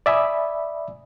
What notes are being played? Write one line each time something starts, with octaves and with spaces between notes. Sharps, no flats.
D5 E5 G#5 B5 D#6